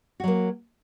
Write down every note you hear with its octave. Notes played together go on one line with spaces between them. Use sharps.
F#3 A#3 F#4